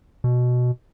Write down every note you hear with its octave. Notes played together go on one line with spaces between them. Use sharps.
B2